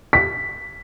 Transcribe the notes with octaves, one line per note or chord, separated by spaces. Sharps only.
B6